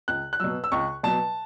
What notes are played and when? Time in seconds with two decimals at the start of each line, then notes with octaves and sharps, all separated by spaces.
0.08 C#2 F#6
0.33 F#6
0.40 B2 F#3 E6
0.64 E6
0.72 C#2 C#6
1.03 B2 F#3 A5